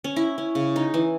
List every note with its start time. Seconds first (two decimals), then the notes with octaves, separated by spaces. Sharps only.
0.04 C#4
0.16 E4
0.38 C#4
0.55 C#3
0.76 D#4
0.94 E3